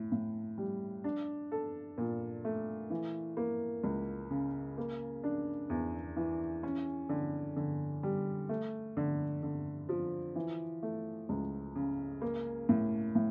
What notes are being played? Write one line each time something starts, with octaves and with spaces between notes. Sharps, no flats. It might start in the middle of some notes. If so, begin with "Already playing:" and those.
Already playing: A2
A2
G3
D4
A4
A#2
A3
E3
A#3
C#2
C#3
A#3
D4
E2
E3
C#4
D3
D3
G3
A3
D3
D3
F3
E3
A3
C#2
C#3
A#3
A2
A2